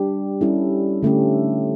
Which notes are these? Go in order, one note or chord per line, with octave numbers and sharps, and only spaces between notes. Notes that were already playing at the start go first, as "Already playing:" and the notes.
Already playing: G3 D4 G4
G3 C#4 E4 A4
D3 A3 C#4 G4